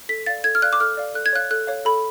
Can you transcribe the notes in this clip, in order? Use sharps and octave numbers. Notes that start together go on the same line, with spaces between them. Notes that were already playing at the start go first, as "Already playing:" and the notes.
A4 B6
D5 F5 A6
A4 G#6
F6
D5 F5 F#6
D6
A4 F6
D5 F5
A4 F#6
G#6
C#5 F5 F#6
A4 F#6
C#5 F5
A4 B5